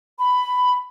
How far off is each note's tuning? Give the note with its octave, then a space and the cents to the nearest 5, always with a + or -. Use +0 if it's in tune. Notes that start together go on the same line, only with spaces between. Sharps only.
B5 +10